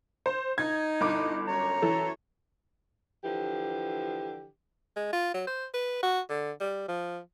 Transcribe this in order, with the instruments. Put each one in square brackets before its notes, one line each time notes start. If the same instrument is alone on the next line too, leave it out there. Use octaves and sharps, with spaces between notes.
[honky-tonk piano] C5
[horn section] D#4 [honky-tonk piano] G#6
[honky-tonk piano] G1 D6 [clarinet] E4
[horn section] F#2 C#5 [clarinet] A#5
[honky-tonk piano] E3 A4
[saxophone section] D3 E3 F3 G4
[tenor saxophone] G#3
F4
F#3
C5
B4
F#4
D3
G3
F3